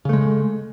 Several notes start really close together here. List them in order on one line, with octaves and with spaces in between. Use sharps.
C#3 A3 G#3